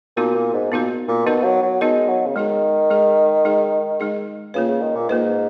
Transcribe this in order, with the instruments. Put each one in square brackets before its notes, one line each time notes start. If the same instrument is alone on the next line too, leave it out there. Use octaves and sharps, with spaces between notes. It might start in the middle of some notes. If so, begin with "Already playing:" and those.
[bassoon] A#2 [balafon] B3 D#4 F#4 A#4
[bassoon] A#2
G#2
[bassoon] A#2 [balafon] B3 D#4 F#4 A#4
[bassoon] A#2
[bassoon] B2 [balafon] B3 D#4 F#4 A#4
[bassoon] F#3
F#3
[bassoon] G#3 [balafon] B3 D#4 F#4 A#4
[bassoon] F#3
C#3
[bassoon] D#3 [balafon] G#3 D#4 G#4
[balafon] G#3 D#4 G#4
G#3 D#4 G#4
G#3 D#4 G#4
[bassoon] C#3 [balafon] A#3 F4 B4
[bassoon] C#3
D#3
A#2
[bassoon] G#2 [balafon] A#3 F4 B4